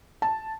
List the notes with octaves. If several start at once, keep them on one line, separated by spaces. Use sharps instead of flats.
A5